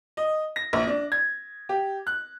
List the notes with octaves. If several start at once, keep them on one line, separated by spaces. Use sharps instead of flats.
D#5
A#6
A#1
D4
G#6
G4
F#6